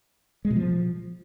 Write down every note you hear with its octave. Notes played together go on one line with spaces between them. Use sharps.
G#3
B2
F3